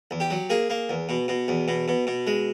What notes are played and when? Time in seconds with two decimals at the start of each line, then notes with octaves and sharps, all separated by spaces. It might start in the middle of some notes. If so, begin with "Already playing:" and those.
0.11 E2
0.20 G4
0.30 F#3
0.50 A#3 G#4
0.70 A#3
0.89 E2
1.09 B2
1.28 B2
1.48 E2
1.68 B2
1.88 B2
2.07 B2
2.27 G#3